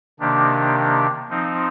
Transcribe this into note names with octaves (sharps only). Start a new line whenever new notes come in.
C3 D#3 A#3 D4 G4
F3 C4 D#4